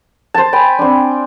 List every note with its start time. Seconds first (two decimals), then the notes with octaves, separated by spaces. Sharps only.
0.34 C5 A5
0.53 G5 G#5 B5
0.79 C4 D4